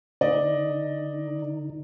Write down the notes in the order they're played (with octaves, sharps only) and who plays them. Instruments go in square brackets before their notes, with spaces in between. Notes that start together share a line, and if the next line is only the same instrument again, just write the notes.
[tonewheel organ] D3 D#4 [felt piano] D5 D#5